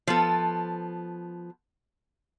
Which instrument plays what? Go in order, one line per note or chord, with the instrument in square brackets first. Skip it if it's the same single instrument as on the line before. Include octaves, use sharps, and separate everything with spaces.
[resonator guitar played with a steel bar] F3 B3 A4